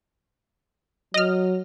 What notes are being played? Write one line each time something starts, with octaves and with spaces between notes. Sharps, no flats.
F#3 D#5 F6